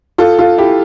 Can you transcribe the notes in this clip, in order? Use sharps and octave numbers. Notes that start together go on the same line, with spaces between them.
F4 A4
F4 A4
E4 G4